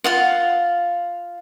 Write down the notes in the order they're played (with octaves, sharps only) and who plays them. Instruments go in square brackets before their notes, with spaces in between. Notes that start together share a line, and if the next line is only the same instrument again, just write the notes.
[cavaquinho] F4 F5 F#5